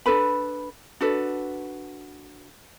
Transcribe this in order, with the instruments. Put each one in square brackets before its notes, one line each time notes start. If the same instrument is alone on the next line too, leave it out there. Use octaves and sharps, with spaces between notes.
[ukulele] D4 A4 B4 B5
D4 F#4 A4 B4